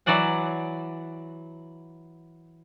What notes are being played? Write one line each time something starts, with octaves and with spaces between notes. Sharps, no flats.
E3 F#3 D5 F#5 G#5